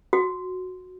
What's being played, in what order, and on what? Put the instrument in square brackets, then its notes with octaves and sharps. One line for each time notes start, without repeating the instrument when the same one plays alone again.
[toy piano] F#4